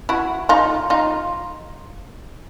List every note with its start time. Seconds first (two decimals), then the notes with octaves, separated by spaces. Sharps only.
0.09 E4 F#4
0.49 D#4 F4
0.90 D#4 F4